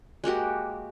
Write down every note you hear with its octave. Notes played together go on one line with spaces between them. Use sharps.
G#3 A#3 F#4 G4